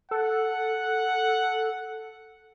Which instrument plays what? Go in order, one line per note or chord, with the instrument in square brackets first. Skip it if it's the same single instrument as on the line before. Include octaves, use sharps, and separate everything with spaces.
[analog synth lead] A4 [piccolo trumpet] F#5